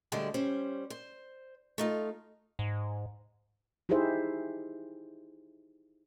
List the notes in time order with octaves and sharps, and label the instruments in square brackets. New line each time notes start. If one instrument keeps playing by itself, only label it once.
[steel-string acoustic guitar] D2 D3 G3 G#3 C5 A5
G3 C#4 C5
C5
A3 D#4 F4
[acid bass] G#2
[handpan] D#4 E4 G4 G#4 C5 E5